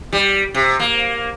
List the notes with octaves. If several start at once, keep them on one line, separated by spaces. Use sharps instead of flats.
G3
C3
A#3